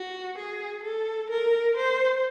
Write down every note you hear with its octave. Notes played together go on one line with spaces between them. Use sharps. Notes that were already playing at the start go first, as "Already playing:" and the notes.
Already playing: F#4
G#4
A4
A#4
C5